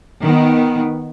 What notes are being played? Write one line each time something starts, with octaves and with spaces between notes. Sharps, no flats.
D#3 B3